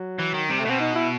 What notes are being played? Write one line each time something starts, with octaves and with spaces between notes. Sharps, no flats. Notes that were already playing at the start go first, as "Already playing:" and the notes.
Already playing: F#3
E3
D#3
C3 G3
A3
B2 C4
D#4
E4